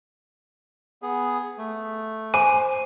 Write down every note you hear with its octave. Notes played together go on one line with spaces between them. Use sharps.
B3 G#4
A3
C5 G#5 D6